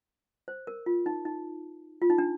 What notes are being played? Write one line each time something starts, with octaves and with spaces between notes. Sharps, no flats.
C5
A#4
F4
D#4
D#4
F4
D#4
D4